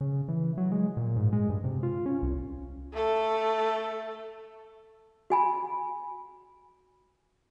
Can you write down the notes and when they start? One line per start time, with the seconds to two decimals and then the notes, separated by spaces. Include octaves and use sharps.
0.01 C#3
0.28 E3
0.57 F#3
0.72 G#3
0.97 A#2
1.16 G#2
1.33 G#3
1.50 G2
1.64 C3
1.83 F4
2.06 C#4
2.22 C2
2.93 A3 A4
5.30 F#4 G#5 B5